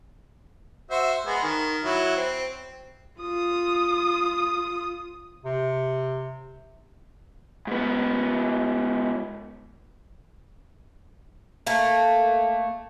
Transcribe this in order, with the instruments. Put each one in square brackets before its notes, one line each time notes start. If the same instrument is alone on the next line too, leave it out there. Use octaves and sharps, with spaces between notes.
[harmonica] F#4 C5 E5
G#3 B3
D#3
F#3 E4
C4
[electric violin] F4 D#6
[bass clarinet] C3
[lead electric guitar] G#2 B3
[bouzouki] A3 A#3